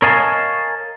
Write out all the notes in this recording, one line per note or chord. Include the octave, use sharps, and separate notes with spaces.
A#4 C#5 D#5 F5 G#5 A5